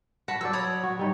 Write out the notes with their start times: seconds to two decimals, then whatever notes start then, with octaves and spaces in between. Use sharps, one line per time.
0.28 F#4 F#5 A5 B5
0.41 F#3 C5 D5 E6
0.53 C#5 B5 D#6
0.83 F#4
0.99 G3 D#4 C#5